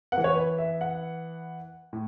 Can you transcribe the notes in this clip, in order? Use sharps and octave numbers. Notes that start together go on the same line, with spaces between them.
B3 F#5
E3
C#5
B4
E5
F#5
A2